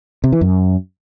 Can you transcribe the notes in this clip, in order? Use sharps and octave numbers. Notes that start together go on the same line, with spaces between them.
C3
E3
F#2